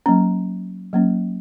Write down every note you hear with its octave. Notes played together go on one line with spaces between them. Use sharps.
F#3 A#3 C#4 A#5
F#3 A#3 C#4